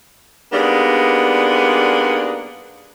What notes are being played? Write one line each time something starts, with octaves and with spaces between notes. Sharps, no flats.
G3 G#3 A#3 B3 D4 D#4